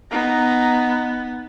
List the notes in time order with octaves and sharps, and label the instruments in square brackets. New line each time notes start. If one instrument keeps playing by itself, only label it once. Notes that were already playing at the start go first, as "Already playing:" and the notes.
[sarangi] B3 [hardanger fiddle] D#4 A#5